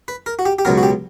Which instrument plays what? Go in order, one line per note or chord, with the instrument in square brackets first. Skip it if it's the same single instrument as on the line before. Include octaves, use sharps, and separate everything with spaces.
[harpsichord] B4
A#4
F#4
G4
G4
C#2 B2 F#3 A#4
F#4
G4